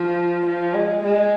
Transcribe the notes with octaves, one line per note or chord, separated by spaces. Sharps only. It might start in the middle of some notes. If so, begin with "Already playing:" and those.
Already playing: F3
F3
G#3
G#3